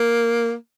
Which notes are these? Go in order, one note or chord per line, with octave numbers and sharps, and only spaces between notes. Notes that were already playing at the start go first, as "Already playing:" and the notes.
Already playing: A#3